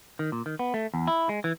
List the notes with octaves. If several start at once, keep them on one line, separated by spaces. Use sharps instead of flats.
D#3
A#2
D#3
B3
A3
E2
E4
G#3
E3